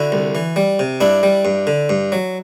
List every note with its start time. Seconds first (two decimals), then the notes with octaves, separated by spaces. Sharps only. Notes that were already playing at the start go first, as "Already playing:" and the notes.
Already playing: D3 E4 F#4
0.12 C2
0.35 E3
0.56 G3
0.79 C3
1.01 G2 D4 E4
1.23 G3
1.45 G2
1.67 D3
1.89 G2
2.12 F#3